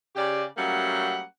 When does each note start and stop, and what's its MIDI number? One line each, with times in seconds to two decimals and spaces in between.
0.16 0.44 49
0.16 0.44 67
0.16 0.44 74
0.57 1.22 54
0.57 1.22 55
0.57 1.22 57
0.57 1.22 58
0.57 1.22 61
0.57 1.22 78